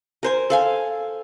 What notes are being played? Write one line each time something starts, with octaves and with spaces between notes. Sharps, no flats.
A#4 C5 G#5
A4 F5 G#5